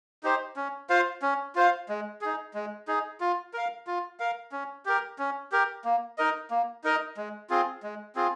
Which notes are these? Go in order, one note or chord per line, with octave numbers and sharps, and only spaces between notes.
D#4 G4 C5
C#4
F4 C5 F5
C#4
F4 C5 F5
G#3
D#4 G#4
G#3
D#4 G#4
F4
A#4 F5
F4
A#4 F5
C#4
G4 A#4
C#4
G4 A#4
A#3
D#4 A#4 D#5
A#3
D#4 A#4 D#5
G#3
C4 F4 G#4
G#3
C4 F4 G#4